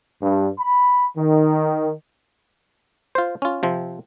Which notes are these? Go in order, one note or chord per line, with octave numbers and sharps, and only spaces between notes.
G2
B5
D#3
F4 C5
C#4 F4
C3 F3 C4